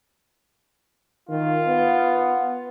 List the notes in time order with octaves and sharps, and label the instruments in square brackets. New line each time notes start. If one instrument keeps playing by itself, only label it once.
[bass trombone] D#3 [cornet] F4
[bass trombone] B3